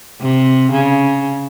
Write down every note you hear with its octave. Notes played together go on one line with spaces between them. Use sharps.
C3
C#3